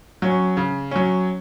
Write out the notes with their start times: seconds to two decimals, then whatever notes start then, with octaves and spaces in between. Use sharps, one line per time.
0.22 F#3 C#4
0.57 C#3
0.91 F#3 C#4